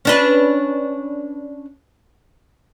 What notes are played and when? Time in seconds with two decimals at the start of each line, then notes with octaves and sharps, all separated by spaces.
0.05 C#4 D4 B4